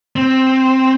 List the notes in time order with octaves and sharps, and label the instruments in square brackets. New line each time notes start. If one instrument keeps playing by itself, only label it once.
[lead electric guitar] C4